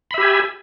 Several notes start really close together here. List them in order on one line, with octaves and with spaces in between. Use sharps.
B5 E5 G4 G#5